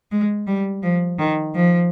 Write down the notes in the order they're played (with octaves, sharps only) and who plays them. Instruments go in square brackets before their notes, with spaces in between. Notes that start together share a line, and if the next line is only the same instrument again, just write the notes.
[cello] G#3
G3
F3
D#3
F3